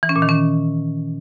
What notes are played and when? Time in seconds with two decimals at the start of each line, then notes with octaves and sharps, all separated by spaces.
0.03 E3
0.09 C#4
0.16 A#2
0.22 D#3
0.29 C#4